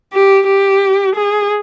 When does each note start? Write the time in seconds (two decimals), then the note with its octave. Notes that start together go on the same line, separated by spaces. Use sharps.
0.13 G4
0.47 G4
1.15 G#4